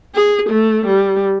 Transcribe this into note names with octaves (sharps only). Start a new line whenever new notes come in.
G#4
A3
G3